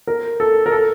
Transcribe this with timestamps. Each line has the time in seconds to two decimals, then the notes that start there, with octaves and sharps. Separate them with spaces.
0.07 A#4
0.40 A4
0.66 A#4
0.72 A4